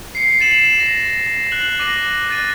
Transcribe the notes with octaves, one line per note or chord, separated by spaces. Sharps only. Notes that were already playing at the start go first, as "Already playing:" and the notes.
C7 C#7
A6 C7 C#7 D#7 E7 F#7
A#6
F#6 A#6 F#7
D6 A#6 D#7 F#7
F#6 A6 D#7